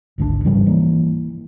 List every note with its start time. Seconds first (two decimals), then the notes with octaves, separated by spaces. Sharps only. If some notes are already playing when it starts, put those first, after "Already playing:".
0.18 G#1 D2 D#3 D4
0.45 G#2 C#3 F3 G3
0.66 E3 A#3